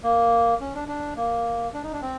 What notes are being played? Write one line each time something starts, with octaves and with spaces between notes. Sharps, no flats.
A#3
C#4
D4
D4
A#3
D4
D#4
D4
C4